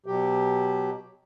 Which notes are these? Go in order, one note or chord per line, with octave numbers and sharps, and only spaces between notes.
B2 F#3 G4